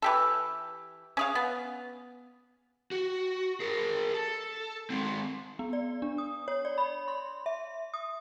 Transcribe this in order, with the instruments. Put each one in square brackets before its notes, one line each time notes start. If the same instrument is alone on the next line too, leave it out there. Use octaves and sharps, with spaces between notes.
[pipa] E3 G4 A4
C#4 G#4 F5
B3
[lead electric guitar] F#4
G#4 A#4
A4
G#3 C4
[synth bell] B3
D5
D4
D#6
C#5
D5
B5
C6
E5
D#6